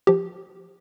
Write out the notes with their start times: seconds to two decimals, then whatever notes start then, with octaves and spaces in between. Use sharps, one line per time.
0.07 F3 G4